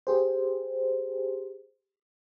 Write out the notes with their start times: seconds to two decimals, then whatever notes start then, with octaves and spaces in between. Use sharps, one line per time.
0.07 G4 G#4 C5